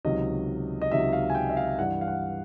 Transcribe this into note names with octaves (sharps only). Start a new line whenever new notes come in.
C#2 C3 D#3 F#3 D#5
D#5
C#2 C3 D#3 F#3 E5
F5
G#5
G5
E5
F5
G2 E3 G3 F#5
F5
F#5